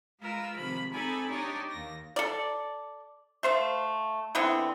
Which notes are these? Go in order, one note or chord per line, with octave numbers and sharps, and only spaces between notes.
G#3 F4 A#4 B4 E6
C3 D#3 F3 G#3 B5
C4 D#4 A4 D5 G#5 B5
D4 D#4 G4 C#5 D5
D#2 A#6
A4 D5
A3 C5 F5
D3 E3 B3 C4